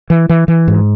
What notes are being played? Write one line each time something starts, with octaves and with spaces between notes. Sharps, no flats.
E3
E3
E3
G#2